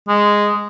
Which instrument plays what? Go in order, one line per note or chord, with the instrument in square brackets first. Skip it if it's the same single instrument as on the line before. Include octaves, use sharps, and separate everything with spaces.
[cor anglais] G#3